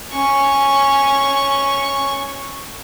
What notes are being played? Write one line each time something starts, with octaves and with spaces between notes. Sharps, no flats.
C#4 C#6